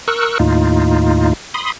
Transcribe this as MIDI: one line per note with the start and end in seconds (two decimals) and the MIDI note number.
0.08 0.38 70
0.08 0.38 85
0.08 0.38 88
0.08 0.38 90
0.39 1.33 39
0.39 1.33 45
0.39 1.33 63
0.39 1.33 65
1.54 1.72 83
1.54 1.72 84
1.54 1.72 87